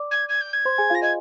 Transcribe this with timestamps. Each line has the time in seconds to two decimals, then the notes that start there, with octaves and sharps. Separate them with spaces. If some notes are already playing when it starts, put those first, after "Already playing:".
Already playing: D5 D6
0.11 G#6
0.29 G#6
0.41 G6
0.53 G#6
0.65 C5 C6
0.78 G#4 G#5
0.90 F4 F5 A#6
1.02 D#5 G#6